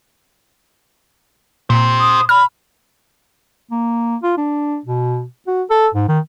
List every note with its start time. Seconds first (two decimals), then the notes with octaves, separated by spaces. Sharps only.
1.70 A#2 G4 C5
2.00 D#6
2.29 B5 F6
3.71 A#3
4.23 F4
4.38 D4
4.85 B2
5.47 F#4
5.70 A4
5.94 G#2
6.09 D#3